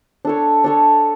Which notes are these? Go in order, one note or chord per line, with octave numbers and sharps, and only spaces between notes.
D4 A4 C#5
D4 A4 C#5